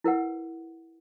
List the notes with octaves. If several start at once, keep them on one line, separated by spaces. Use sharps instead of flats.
E4 A#4 B4 F#5